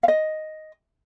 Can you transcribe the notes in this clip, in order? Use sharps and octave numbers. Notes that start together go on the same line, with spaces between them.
F5
D#5